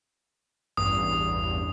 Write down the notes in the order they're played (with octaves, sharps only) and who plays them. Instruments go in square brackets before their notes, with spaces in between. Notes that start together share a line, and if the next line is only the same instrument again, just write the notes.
[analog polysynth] A1 E2 G2 [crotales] D#6